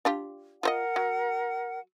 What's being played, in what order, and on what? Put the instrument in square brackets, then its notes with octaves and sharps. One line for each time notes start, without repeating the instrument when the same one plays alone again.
[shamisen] D4 F4 G4
[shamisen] F4 C5 D#5 [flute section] A#4 F#5
[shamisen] F#3